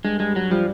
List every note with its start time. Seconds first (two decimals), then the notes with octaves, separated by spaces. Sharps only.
0.04 G2 G#3
0.20 G2 G#3
0.35 G2 F#3
0.51 F3 G3